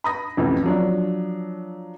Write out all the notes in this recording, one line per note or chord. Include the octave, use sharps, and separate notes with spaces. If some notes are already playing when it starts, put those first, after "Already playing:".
B5 D#6 A#6
A1 F2 C3 E3
F3 F#3 D4